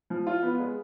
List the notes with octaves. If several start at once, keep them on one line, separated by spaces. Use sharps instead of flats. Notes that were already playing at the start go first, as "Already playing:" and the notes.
F3
F4
B3
G#3